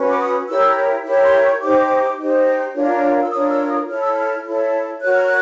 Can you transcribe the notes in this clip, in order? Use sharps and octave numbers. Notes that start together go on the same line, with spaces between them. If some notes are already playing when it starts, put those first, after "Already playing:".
Already playing: C#4 F#4 B4
D6
D#6
E4 G4 A#4 C#5 E6
E4 G4 A#4 C#5
C6
C#6
D#4 G4 C5 D6
D#4 G4 C5
D4 F4 A#4 C#5
E6
D4 F4 A#4 C#5 D#6
E6
D#6
E4 A4 C#5 F6
E6
F6
E4 A4 C#5
F#4 A#4 C#5 F#6
F6
F#6